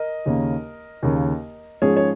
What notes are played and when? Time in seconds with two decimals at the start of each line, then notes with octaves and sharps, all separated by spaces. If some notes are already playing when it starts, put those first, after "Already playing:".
Already playing: A#4 D#5
0.26 D#2 C#3 A#3
1.03 D#2 C#3 A#3
1.82 G#2 F3 C#4 G#4 C#5
1.97 C#5